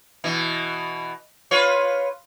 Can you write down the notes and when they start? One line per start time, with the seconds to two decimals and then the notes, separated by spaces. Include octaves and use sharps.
0.24 B2 E3
1.51 F4 B4 C#5